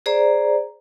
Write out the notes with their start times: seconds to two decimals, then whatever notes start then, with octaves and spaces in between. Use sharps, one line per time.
0.06 G#4 C5 D5 A#5